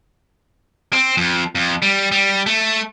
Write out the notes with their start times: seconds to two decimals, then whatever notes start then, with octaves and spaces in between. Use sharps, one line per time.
0.93 C4
1.17 F2
1.55 F2
1.82 G3
2.12 G3
2.46 A3